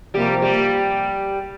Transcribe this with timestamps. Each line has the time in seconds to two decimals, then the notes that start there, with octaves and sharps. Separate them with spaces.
0.14 C3 F3 G3 A#3 G4
0.42 G3 G4